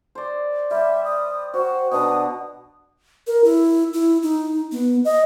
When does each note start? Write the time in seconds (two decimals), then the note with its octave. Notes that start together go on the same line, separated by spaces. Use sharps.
0.15 C5 D5
0.71 G3 E5
1.05 D#6
1.54 F#4 C5
1.92 B2 D4 A#5 D#6
3.27 A#4
3.44 E4
3.93 E4
4.23 D#4
4.72 B3
5.05 D#5